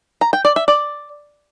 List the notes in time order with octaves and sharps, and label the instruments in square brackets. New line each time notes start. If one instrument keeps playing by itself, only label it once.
[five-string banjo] A#5
G5
D5
E5
D5